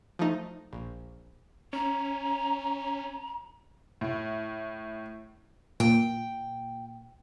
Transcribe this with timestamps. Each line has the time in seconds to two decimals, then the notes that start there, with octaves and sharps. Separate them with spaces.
0.19 F3 A3 D#4
0.73 A#1
1.73 C#4 A#5
4.01 A2
5.80 A#2 G5